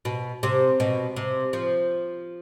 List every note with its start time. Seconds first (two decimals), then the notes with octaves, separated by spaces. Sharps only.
0.05 B2
0.43 C3
0.80 B2
1.16 C3
1.53 F3